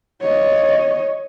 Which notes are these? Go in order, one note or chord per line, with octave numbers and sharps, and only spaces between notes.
C#5 D#5